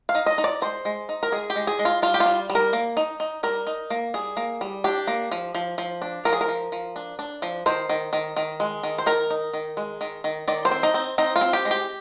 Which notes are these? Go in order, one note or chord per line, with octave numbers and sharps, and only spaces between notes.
F5
D#4
D#5
D#4
D5
G#3 C5
G#3
D#4
A#4
G#3 G#4
G4
G#3
G#4
G#3
F4
G3 F4
G4
F4
G3
G3
A#4
A#3
D#4
D#4
G3 A#4
D#4
A#3
G3 G#4
A#3
G3
D4 G4
A#3
F3
F3
F3
D4
F3 A#4
G#4
A#4
F3
F3
D4
D4
F3
D#3 C5
D#3
D#3
D#3
G#3
D#3
C5
D#3 A#4
D#4
D#3
G#3
D#3
D#3
D#3 D5
C5
C4
D#4
C4
C4 D#4
F4
C4
G4
G#3
G4